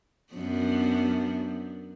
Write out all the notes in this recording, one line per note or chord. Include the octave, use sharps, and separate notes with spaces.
F#2 B3 D4